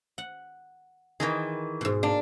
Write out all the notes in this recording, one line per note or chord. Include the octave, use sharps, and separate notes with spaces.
F#5
D#3 E3 G#4 A#4 D#5
G#2 B2
A#3 D4